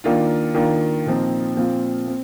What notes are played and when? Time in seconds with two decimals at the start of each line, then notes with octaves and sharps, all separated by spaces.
0.04 D#3 A#3 D4 F4
0.55 D#3 A#3 D4 F4
1.06 A#2 F3 C4 D#4
1.57 A#2 F3 C4 F4
2.08 C4